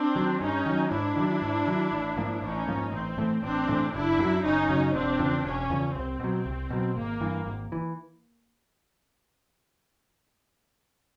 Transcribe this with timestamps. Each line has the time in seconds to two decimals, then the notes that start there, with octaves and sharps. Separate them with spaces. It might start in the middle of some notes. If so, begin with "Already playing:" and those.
Already playing: C4 D4
0.15 D#3 F#3
0.40 G2 C#4 D#4
0.66 D#3 F#3
0.91 G#2 D4 E4
1.16 D#3 F#3
1.42 G#2
1.67 D#3 F#3
1.92 A1
2.17 G#2 F3 A#3
2.42 A1 C#4 D#4
2.67 G#2 F3 A#3
2.92 A1 C4
3.18 A2 E3 A3
3.43 A1 C4 D4
3.68 A2 E3 A3
3.93 F#1 D4 E4
4.18 F#2 C#3 F#3
4.44 F#1 C#4 D#4
4.69 F#2 C#3 F#3
4.94 E1 C4 D4
5.19 E2 C#3 F3
5.45 E1 C#4
5.70 E2 C#3 F3
5.95 C2 C4
6.20 B2 F#3
6.46 C2
6.70 B2 F#3
6.96 G#1 A#3
7.21 G2 E3
7.46 G#1
7.72 E3